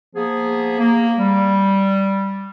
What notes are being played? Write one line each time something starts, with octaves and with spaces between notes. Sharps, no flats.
F3 A#3 B3 G#4
A#3
G3